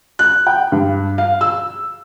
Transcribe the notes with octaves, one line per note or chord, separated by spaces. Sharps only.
F#6
G5
G2
F5
E6